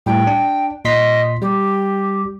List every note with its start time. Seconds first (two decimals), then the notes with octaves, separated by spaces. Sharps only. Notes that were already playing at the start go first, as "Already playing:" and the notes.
0.06 A2 G3 G5
0.27 D4
0.85 A#2 D#5 C6 B6
1.42 G3 G4